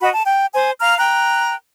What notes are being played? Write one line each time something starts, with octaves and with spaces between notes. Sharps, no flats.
F#4 D#5 B5
A5
G5
C5 G#5
F5 A#5 F6
G5 A#5 F#6